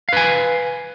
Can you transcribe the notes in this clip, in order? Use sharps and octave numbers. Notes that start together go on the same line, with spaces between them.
B4 F5 G#5